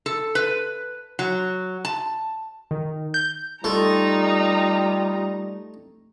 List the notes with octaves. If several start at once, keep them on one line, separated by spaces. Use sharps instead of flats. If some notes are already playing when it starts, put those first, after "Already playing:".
A4
B4
F#3
A5
D#3
G6
G3 A3 D#4 F4 A#5